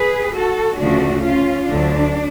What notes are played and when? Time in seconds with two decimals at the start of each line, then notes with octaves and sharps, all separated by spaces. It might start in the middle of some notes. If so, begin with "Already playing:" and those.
Already playing: G#4 B4
0.33 F#4 A4
0.77 D2 C#3 F3 A3 D4 F#4
1.22 C#4 F4
1.67 D2 D3 F#3 D4